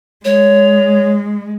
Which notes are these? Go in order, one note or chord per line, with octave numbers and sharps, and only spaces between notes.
G#3 C#5